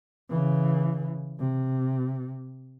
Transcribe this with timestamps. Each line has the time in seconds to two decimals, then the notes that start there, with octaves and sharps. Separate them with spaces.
0.30 C#3 E3
1.39 C3